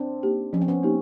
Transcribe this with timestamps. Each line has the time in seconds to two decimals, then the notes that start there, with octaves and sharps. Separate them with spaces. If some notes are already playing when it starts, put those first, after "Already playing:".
Already playing: C4 D4
0.23 A#3 D#4 G4
0.53 F3 C#4
0.61 C4
0.68 B3 C#4
0.83 A#3 D#4 G4